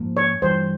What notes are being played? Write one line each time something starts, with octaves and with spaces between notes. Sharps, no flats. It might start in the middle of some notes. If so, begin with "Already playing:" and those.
Already playing: G#2 F3 A#3
C#5
G2 E3 G3 C5